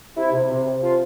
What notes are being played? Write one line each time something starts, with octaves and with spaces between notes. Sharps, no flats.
C3 E4
C3
C3
C3
F3 F4